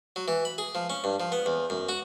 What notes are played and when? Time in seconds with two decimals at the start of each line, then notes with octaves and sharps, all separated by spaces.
0.16 F#3
0.28 E3
0.45 B5
0.58 G#4
0.75 F3
0.90 C#4
1.04 G2
1.20 F3
1.32 B3
1.46 E2
1.70 F#2
1.89 F#4